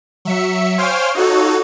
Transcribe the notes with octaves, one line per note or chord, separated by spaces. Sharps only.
F#3 E5 C#7
C5 C#5 F5 G5 G#5 F6
D#4 F4 F#4 A4 C#5